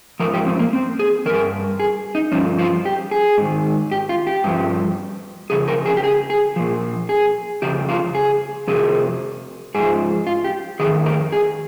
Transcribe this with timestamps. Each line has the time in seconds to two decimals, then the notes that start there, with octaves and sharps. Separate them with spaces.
0.20 G#2 F3 A#4
0.33 G4
0.46 C4
0.59 A#3
0.73 C4
0.99 G#4
1.26 G2 D#3 A#4
1.80 G#4
2.15 D#4
2.32 G2 F3 C#4
2.59 F4
2.86 G4
3.11 G#4
3.38 G#2 D#3
3.92 G4
4.09 F4
4.27 G4
4.44 G2 F3
5.50 F2 C#3 G#4
5.68 A#4
5.86 G#4
5.97 G4
6.04 G#4
6.30 G#4
6.56 A#2 F3
7.09 G#4
7.62 F2 C#3 G4
7.88 F4
8.15 G#4
8.67 F2 C3 G#4
9.75 G#2 F3 G#4
10.27 F4
10.44 G4
10.80 F2 D#3 G#4
11.06 A#4
11.32 G#4